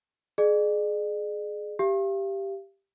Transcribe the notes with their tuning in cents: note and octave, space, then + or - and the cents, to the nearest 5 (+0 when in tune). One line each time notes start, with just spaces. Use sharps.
G#4 +20 D5 +45
G4 +0 F5 -40